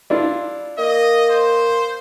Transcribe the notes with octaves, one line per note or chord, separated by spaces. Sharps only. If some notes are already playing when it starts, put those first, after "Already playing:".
D4 E4 F4
A#3 D#5
C5